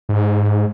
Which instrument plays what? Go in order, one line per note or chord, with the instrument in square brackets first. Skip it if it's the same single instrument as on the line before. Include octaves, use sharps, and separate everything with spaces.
[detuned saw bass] G#2